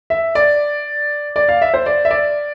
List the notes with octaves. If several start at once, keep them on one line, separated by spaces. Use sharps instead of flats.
E5
D5
D5
F5
E5
C5
D5
E5
D5